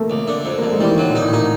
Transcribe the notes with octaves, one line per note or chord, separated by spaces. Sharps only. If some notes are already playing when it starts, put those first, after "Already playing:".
Already playing: A3 A#3
C#2
D3
F2
A#3
F2 A3
G#3
E3 G3
D#3
D3 F#3
A#2
D#4
A2
A#2 D#4